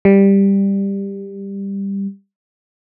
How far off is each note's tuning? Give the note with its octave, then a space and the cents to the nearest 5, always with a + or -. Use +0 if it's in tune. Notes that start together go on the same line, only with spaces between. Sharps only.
G3 +10